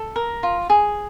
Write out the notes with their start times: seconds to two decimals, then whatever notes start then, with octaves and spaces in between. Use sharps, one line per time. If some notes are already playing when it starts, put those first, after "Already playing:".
Already playing: A4
0.16 A#4
0.43 F4
0.70 G#4